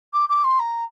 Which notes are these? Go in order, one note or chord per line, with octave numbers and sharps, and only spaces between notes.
D6
D6
C6
A#5